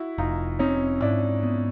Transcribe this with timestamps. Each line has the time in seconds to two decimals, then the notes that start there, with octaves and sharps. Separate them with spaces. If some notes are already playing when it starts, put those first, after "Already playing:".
Already playing: E4 F#4
0.18 F1 D#4 F4
0.59 C4 C#4 D#4
1.02 G#2 D4 E4
1.43 B3